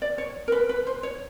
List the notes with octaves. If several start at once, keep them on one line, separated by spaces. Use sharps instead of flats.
D5
C#5
A#4
B4
B4
C5
C#5